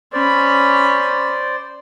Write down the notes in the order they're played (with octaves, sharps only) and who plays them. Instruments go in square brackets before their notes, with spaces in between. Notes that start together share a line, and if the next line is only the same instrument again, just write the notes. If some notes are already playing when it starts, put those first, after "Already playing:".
[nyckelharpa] C#4 B5 [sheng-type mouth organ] C5 D5